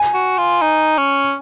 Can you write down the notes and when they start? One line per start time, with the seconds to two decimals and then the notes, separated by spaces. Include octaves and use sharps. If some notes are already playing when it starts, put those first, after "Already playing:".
Already playing: G#5
0.14 F#4
0.38 F4
0.61 D#4
0.98 C#4